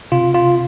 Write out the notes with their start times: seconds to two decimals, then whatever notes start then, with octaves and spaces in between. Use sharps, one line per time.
0.12 C3 F4
0.34 F4